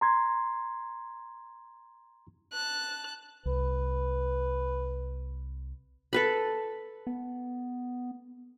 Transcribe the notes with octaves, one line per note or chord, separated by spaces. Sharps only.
A#5 C6 G#6
A5 F#6
C2 B4
A4 B4 B5
B3